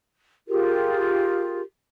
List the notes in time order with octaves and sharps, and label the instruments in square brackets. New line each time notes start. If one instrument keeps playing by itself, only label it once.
[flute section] F4 G4 G#4 A#4